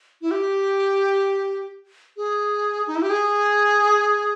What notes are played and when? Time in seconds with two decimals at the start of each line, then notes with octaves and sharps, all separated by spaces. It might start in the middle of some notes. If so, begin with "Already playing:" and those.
0.22 E4
0.31 G4
2.17 G#4
2.87 D#4
2.95 E4
3.02 G4
3.10 G#4